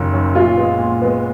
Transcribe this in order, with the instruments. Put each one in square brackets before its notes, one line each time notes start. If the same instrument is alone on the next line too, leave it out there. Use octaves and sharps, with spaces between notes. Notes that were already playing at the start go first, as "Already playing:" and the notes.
Already playing: [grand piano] F#1 F#2 D#3
F#2 D#3
[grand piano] A#2 [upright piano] F4
[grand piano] G#3 B3
A#2
G#3 B3